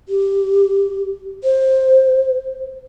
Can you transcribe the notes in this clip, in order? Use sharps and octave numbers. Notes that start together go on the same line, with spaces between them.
G4
C5